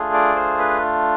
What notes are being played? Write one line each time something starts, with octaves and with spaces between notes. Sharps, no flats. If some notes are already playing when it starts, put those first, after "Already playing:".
Already playing: A3 D4 F4 G#4
D5
C5
B4